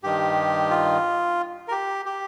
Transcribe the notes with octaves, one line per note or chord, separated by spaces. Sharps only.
G2 D#3 G4
F4
A#4
G4
G4